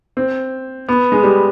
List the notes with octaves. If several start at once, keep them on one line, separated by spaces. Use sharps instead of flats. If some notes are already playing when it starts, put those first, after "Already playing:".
C4
B3
G#3
G3